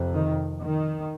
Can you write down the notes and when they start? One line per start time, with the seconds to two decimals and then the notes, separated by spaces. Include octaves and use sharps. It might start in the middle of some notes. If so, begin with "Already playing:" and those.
Already playing: F2 C3
0.14 D#3
0.61 D#3